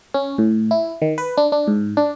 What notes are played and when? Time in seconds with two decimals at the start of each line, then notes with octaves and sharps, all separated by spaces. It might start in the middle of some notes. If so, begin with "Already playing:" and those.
0.14 C#4
0.38 A2
0.71 E4
1.02 D#3
1.18 B4
1.38 D4
1.52 D4
1.68 G#2
1.97 D4